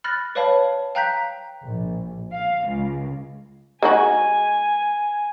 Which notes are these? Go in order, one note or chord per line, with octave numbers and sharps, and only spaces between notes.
B5 F6 F#6 A6 A#6
B4 C#5 D5 F5 A5 B5
F5 G5 A#5 F#6 G6 B6
A#1
F5
C#2
G#3 D#4 F#4 G#5